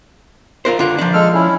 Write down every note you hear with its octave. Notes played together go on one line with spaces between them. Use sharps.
F4 A#4 C5
D3 F4
F3 D4
G#3 A4 F6
C#4 E4